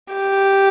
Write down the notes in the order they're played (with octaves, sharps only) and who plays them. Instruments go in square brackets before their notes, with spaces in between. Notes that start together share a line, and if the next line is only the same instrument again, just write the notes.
[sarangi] G4